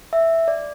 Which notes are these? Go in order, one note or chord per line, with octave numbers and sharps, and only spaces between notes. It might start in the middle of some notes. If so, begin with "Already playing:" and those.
E5
D5